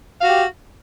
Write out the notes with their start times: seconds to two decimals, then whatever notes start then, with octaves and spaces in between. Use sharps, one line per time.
0.19 F5
0.24 F#4
0.29 G4